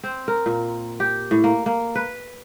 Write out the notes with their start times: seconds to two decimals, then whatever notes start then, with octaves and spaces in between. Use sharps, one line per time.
0.04 C4
0.28 A#4
0.46 A#2
1.00 G4
1.31 A2
1.44 A#3
1.66 A#3
1.95 B4